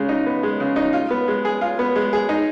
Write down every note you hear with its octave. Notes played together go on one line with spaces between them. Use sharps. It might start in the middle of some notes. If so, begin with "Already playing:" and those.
Already playing: C#3 G#3
D#4
B3
G#3
C#3
D#4
F4
B3
G#3
G#4
F4
B3
G#3
G#4
D#4